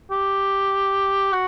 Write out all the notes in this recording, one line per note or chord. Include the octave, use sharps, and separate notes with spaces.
G4
F#4